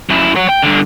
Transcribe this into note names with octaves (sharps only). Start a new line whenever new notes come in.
F#2 E4
C#5 F#5
G5
G2 D3